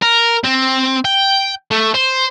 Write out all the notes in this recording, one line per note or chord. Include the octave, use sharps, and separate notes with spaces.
A#4
C4
G5
A3
C5